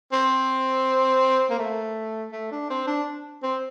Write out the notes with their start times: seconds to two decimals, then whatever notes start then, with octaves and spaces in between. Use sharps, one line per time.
0.12 C4
1.50 A#3
1.59 A3
2.32 A3
2.51 D4
2.70 C4
2.87 D4
3.43 C4